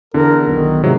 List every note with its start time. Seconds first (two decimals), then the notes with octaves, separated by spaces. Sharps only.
0.14 E2 D3 A#4
0.48 B1 D#3
0.84 G#2 C3 F#3